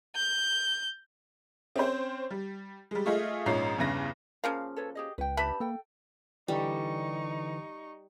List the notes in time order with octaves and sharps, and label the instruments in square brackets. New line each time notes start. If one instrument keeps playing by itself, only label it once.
[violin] G6
[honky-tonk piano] C4 C#4 C5
G3
G3 G#3
A3 F4 G#4 D#5 E5
A#1 G#2 F3 C#4 D#5 C7
E2 G2 C#3 A#6
[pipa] C#3 F3 A#3 [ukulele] F5
[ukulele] A4 B4 C#5
G4 G#4 D#5
[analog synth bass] C#2 [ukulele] B4 G5
[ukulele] D4 G4 A5 [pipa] B4 E5 B5
[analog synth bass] A#3 [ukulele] A4 G5
[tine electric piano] D3 E3 [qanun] G3 [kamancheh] D#4 C#6